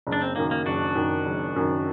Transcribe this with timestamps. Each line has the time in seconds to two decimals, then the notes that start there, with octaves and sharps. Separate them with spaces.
0.07 F#1
0.12 D4
0.22 C4
0.36 F#2 D#3 A#3
0.51 A#3
0.66 F#1 D4 F#4
0.95 F#2 D#3
1.26 F#1
1.56 F#2 D#3